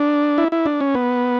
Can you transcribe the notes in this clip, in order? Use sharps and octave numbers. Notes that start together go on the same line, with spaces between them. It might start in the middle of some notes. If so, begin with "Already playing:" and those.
Already playing: D4
E4
E4
D4
C#4
B3